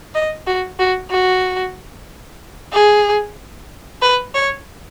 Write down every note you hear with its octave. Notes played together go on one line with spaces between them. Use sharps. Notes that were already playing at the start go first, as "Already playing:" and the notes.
D#5
F#4
F#4
F#4
G#4
B4
C#5